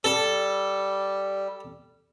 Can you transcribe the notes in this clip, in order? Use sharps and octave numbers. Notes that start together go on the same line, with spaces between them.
G3 A4